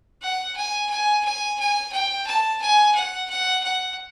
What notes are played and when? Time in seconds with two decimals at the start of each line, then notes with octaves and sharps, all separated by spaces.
0.22 F#5
0.57 G#5
0.90 G#5
1.25 G#5
1.59 G#5
1.92 G5
2.27 A5
2.62 G#5
2.95 F#5
3.30 F#5
3.64 F#5